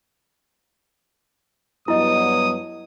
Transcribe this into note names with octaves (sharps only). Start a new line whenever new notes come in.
G2 F#3 B3 E4 D#5 D#6